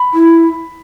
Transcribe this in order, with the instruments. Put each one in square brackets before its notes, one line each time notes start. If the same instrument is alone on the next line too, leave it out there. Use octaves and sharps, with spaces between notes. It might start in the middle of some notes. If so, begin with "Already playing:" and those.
Already playing: [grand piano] B5
[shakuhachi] E4